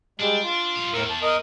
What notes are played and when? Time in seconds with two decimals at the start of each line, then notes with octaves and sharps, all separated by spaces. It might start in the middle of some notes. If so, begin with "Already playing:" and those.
0.20 G3 G#3 D4
0.43 F4
0.76 G3 F5
0.93 E2 A2 A#4 E6
1.10 A5
1.23 A#4 D#5 D#6